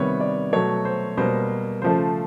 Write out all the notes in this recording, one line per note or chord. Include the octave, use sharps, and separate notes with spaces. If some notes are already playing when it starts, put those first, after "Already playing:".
Already playing: C3 D#3 G3 B3 C#5
D5
B2 F#3 A3 C#5
C5
B2 G3 A#3 C5
C#3 F3 A3 C5